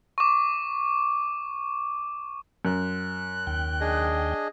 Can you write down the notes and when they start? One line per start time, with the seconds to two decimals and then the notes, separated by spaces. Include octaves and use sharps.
0.18 C#6 D6
2.65 F#2 F#6
3.47 D#2 G5
3.80 D4 G#4 D#5